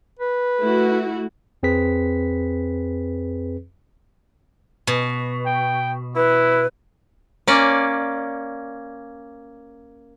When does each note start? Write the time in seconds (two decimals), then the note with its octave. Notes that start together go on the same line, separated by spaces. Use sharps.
0.19 B4
0.59 A3 E4 F#4
1.63 F2 C4 G#4 B4 B6
4.87 B2
5.46 G5
6.16 E4 B4
7.47 A#3 C#4 D5